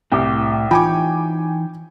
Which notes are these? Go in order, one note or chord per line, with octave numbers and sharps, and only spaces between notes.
C2 A2 C4 F#4 G4 G5
E3 D#4 F4 C#5 G5 G#5 D6